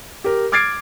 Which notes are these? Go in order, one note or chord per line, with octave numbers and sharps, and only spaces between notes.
G4 A#4
D6 F6 G#6 A6 C7 D7